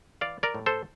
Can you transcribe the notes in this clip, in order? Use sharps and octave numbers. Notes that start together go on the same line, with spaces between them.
E3 D5 F5
A#4 D5
A2
A4 C5